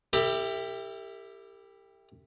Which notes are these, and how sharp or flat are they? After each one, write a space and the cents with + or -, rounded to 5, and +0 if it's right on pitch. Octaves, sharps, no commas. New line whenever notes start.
E4 +0 G4 +15 A#4 -45